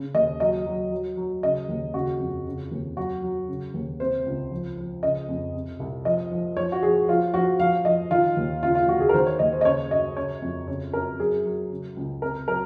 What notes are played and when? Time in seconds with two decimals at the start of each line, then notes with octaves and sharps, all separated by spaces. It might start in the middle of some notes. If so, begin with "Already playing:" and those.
Already playing: C#3
0.14 D#2 D#5
0.40 F#3 D#5
0.66 F#3
0.92 F#3
1.17 F#3
1.43 C#3 D#5
1.69 D#2
1.94 C#3 F#4
2.20 F2
2.46 C#3
2.71 D#2
2.97 F#3 F#4
3.23 F#3
3.48 C#3
3.74 D#2
4.00 C3 C5
4.26 C#2
4.51 F3
4.77 F3
5.03 C#3 D#5
5.29 F2
5.55 C3
5.80 C2
6.05 F3 D#5
6.31 F3
6.57 F3 C#5
6.72 F#4
6.83 F3 G#4
7.08 F3 F4
7.34 F3 F#4
7.60 F3 F5
7.85 F3 D#5
8.11 D#3 F4
8.37 D#2
8.63 C#3 F4
8.75 F4
8.88 D#2 F#4
9.00 G#4
9.09 A#4
9.14 D#3 C5
9.27 C#5
9.39 D#2 D#5
9.52 C5
9.61 D#5
9.65 C#3 C#5
9.91 F#2 D#5
10.17 C#3 C#5
10.42 F2
10.68 C#3 C#5
10.93 F#2 A#4
11.19 F#3 G#4
11.45 F#3
11.71 C#3
11.97 C#2
12.22 C3 A#4
12.48 F#3 A#4